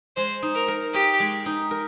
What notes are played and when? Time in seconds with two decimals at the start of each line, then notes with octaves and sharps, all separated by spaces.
0.17 G#3 C5
0.42 D#4
0.55 A#4
0.68 A#4
0.94 G4 D#5
1.20 G#3
1.46 D#4
1.71 A#4